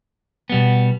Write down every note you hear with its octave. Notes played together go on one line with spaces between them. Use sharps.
B2 G3 B3